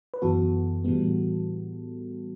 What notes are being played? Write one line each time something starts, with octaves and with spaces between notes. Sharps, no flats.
B4
F#2 E3 B3 F#4 A4
A2 E3 G3 B3